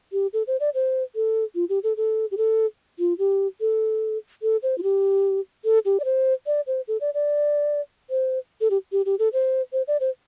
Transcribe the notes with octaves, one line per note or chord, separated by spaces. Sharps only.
G4
A4
C5
D5
C5
A4
F4
G4
A4
A4
G4
A4
F4
G4
A4
A4
C5
F4
G4
A4
G4
D5
C5
D5
C5
A4
D5
D5
C5
A4
G4
G4
G4
A4
C5
C5
D5
C5